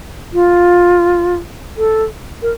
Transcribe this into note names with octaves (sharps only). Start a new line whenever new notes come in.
F4
A4
A#4